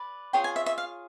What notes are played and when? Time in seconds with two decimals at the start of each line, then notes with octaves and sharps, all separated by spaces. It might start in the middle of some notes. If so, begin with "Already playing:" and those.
Already playing: B4 D5
0.33 F4 G#4 C#5 G5
0.44 G#5
0.56 E5
0.66 E5
0.78 F5